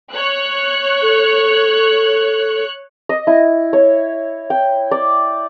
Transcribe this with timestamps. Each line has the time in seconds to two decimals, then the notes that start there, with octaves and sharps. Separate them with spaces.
0.13 C#5 F#6
1.02 A4
3.09 D#5
3.27 E4
3.73 C#5
4.50 G5
4.91 D5